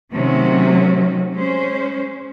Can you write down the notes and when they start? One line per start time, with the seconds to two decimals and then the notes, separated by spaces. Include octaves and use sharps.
0.13 C3 D#3 F#3 A3 C#4 F#4
1.35 G#3 C#4 C5